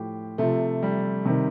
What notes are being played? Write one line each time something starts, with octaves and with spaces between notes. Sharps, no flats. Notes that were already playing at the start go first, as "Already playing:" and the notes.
Already playing: A2 F3 G4
C3 F3 A3
G3
C3 D#3